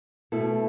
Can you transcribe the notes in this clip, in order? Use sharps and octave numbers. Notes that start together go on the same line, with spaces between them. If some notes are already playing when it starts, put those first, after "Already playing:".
B2 A3 E4 A4